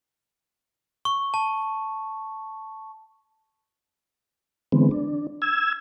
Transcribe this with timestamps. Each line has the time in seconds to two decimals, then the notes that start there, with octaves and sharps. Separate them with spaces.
1.05 C#6
1.34 A5
4.72 D3 E3 G#3 B3 C4
4.91 D4
5.42 E6 G#6